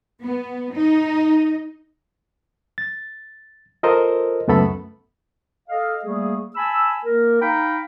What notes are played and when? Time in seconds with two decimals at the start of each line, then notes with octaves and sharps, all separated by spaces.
0.23 B3
0.75 D#4
2.78 A6
3.83 F4 A4 A#4 C5 D#5
4.48 C#2 F#2 A3 B3 A4 B5
5.68 A4 D#5 F5
6.04 G3 A3 A#3 G#4
6.55 G#5 A5 B5 E6
7.03 A#3 A#4
7.41 D#4 F5 G5 A#5 B5